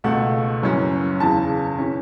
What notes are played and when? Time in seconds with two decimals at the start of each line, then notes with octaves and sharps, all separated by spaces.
0.04 C#2 B2 A3 F#5
0.62 F#1 F#2 E3 C#4
1.20 E2 C#3 E3 A5
1.78 E3 C#4